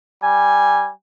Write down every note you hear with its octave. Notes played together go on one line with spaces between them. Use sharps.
G3 G#5